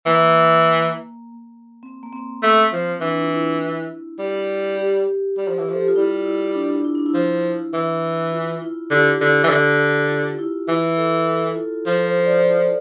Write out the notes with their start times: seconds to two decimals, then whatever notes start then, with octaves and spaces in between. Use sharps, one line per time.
0.06 E3 A#3
1.83 C4
2.03 A#3
2.13 C4
2.43 A3
2.72 F3
3.00 E3 D4
3.22 F4
3.31 E4
4.18 G3
4.77 G4
5.37 G3
5.48 F3
5.58 E3
5.69 F3
5.74 A4
5.81 G4
5.88 F4
5.96 G3 E4
6.25 E4
6.55 D4
6.85 E4
6.95 D4
7.06 E4
7.14 F3
7.73 E3
8.32 F4
8.62 E4
8.90 D3 G4
9.21 D3
9.43 E3
9.49 D3
10.09 F4
10.33 F4
10.39 E4
10.68 E3 E4
10.97 A4
11.27 A4
11.56 F4
11.86 F3 A4
12.05 C5
12.26 D5